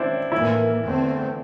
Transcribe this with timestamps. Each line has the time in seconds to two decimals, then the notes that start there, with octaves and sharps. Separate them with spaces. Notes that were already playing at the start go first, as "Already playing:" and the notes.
Already playing: C4 D4 E4
0.32 A2 E3 A#3 E4
0.83 E2 D3 A3 C4